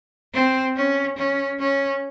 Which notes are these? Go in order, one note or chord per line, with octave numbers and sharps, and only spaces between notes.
C4
C#4
C#4
C#4